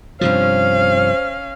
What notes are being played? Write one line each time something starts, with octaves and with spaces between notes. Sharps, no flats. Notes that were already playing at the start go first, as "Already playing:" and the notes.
G2 C3 F3 C#4 C5 F5